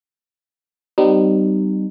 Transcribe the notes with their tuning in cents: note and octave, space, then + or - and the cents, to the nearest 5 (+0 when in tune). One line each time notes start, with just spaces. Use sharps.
G3 -25 B3 +45 D#4 -30